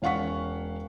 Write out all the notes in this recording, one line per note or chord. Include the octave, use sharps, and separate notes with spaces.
E1 C#4 F5 F#5 C#6 B6